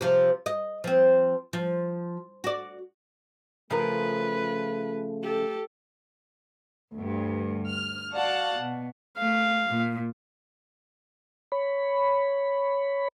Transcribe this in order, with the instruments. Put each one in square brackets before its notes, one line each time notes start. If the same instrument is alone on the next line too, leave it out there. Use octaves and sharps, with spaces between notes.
[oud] C3 F3
D#5
F3 C4
F3
F#4 D5
[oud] C#3 F3 A#4 [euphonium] A3 [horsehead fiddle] F4 B4
[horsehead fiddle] G4 A4
[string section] D2 G2
F6
F#4 D5 F5 F#5 A5
B2
[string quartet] A3 [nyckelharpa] F5
[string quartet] A#2
[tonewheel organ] C#5 B5